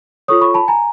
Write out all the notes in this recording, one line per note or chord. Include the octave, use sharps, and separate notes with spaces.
F4 A4 C#5 C#6 D#6
B5 C#6
A5 B5
G#5 A#5